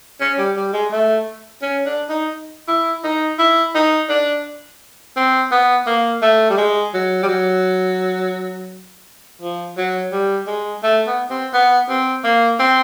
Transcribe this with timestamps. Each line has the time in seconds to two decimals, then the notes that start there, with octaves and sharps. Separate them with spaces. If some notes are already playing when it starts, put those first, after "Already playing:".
0.21 C#4
0.38 G3
0.56 G3
0.73 G#3
0.91 A3
1.62 C#4
1.86 D4
2.09 D#4
2.68 E4
3.04 D#4
3.39 E4
3.75 D#4
4.10 D4
5.17 C4
5.52 B3
5.87 A#3
6.22 A3
6.50 G3
6.57 G#3
6.94 F#3
7.23 G3
7.28 F#3
9.42 F3
9.77 F#3
10.12 G3
10.47 G#3
10.83 A3
11.07 B3
11.30 C4
11.53 B3
11.89 C4
12.24 A#3
12.60 C4